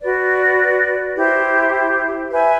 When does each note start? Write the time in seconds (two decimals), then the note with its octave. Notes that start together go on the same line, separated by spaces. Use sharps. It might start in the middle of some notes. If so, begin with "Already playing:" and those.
0.01 F#4 B4 D5
1.16 E4 G4 C5
2.31 B4 E5 G#5